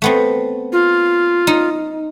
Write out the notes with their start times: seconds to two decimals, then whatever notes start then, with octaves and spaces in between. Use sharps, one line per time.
0.02 A3 B3 C4
0.72 F4
1.47 D#4